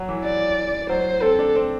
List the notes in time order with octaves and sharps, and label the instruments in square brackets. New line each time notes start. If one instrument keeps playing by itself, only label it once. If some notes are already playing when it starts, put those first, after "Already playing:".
Already playing: [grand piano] F#3
E3
[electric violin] D5
[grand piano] F#3 [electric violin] C5
[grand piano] C4 [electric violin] A4
[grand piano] D4
C4